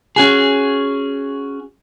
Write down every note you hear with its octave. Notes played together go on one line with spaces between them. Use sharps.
C#4 F#4 G#4